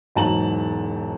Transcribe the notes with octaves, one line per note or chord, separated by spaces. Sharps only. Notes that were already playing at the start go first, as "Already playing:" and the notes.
E1 G#2 F#3 A5 A#5 F#7